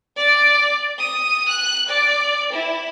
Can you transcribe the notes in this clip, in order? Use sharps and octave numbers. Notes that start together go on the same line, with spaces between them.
D5
D#6
F#6
D5
E4